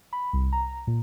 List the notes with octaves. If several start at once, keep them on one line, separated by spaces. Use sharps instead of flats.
B5
C2
A#5
A#2